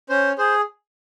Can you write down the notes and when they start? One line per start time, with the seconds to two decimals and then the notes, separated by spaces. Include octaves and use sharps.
0.09 C#4 C5
0.38 G#4 C5